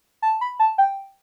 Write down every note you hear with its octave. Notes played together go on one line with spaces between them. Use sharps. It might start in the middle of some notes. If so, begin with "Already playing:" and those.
A5
B5
A5
G5